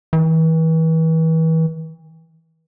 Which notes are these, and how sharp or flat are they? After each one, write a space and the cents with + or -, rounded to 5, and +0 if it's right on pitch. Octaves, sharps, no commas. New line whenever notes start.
E3 -35